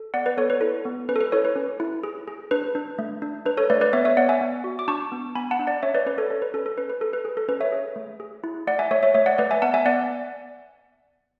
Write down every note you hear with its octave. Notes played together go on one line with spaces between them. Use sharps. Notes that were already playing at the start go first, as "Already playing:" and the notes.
Already playing: A4
B3 D5 F#5
B4 D5
B3 A4 C#5
B4
E4 A4
B3
C#4 B4
A4
B4
E4 A4 C#5
B4
C#4
E4
G#4
G#4
D4 B4
D4
A3
D4
D4 B4
A4 C#5
A3 B4 D5
B4 D5
B3 C#5 E5
C#5 E5
B3 D5 F#5
E5 G#5
B3
F#4
D6
D4 A5 C#6
B3
B3 G#5 B5
F#5 A5
D4
D5 F#5
C#4 C#5 E5
B4 D5
C#4 B4
A4 C#5
A4
B4
C#4 A4
A4
C#4 B4
B4
G#4 A4
B4
G#4
A4
C#4 B4
C#5 E5
G#4
A3
G#4
E4
A3 D5 F#5
E5 G#5
A3 C#5 E5
C#5 E5
A3 C#5 E5
D5 F#5
A3 B4 D5
E5 G#5
B3 F#5 A5
E5 G#5
B3 D5 F#5